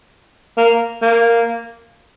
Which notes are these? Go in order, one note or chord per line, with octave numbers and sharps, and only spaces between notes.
A#3
A#3